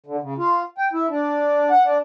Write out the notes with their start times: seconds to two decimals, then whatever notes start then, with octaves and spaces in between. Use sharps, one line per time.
0.06 D3
0.21 C#3
0.38 F4
0.78 G5
0.93 E4
1.10 D4
1.70 F#5
1.85 D4